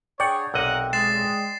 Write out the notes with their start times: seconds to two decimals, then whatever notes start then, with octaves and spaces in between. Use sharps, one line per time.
0.20 D4 G#4 C#5 D5 F#5 G5
0.54 B1 C3 A#4 D#5 F#5
0.93 G#3 A6 C7 E7